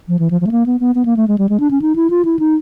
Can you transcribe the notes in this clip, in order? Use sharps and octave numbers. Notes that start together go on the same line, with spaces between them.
F3
E3
F3
F3
A3
A#3
B3
B3
B3
A#3
A3
G#3
G3
G#3
D4
C#4
D#4
E4
F4
E4
D#4